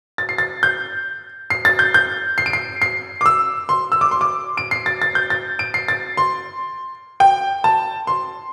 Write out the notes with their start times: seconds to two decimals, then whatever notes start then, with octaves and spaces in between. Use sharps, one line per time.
0.18 A6
0.29 C7
0.38 A6
0.63 G6
1.50 C7
1.65 A6
1.79 G6
1.94 G6
2.38 C7
2.46 D7
2.53 C7
2.82 C7
3.21 D6
3.26 E6
3.69 C6
3.92 E6
4.01 D6
4.11 C6
4.21 D6
4.57 D7
4.71 C7
4.86 A6
5.02 A6
5.15 G6
5.30 A6
5.59 D7
5.74 C7
5.88 A6
6.17 C6
7.20 G5
7.64 A5
8.07 C6